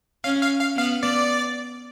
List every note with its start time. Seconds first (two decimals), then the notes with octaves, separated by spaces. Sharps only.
0.24 C#4 F5
0.42 F5
0.60 F5
0.77 B3 F5
1.03 D5